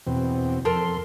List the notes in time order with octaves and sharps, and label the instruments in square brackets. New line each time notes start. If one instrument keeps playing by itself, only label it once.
[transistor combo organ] E2 B2 C4
[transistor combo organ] F2 C6 [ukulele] A4 A#4